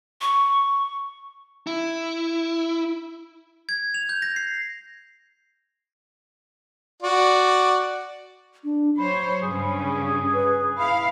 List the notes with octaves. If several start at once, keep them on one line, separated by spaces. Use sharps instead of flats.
C#6
E4
G#6
F7
G6
A#6
C7
F#4 D5
D4
F#3 C5 C#5 B5
G2 C#3 C#4 G#4
B4
E4 F5 B5